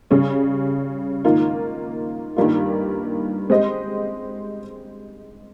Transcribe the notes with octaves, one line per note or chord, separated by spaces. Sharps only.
C#3 G3 C#4 G#4
G#2 D#3 A#3 F4
G2 D#3 G3 A#3 F4
G#3 C4 G4 C5 D#5